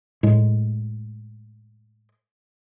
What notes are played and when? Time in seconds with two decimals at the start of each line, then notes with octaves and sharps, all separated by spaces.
0.23 A2 G#3